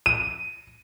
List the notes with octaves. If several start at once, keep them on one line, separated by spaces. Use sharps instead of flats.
D#7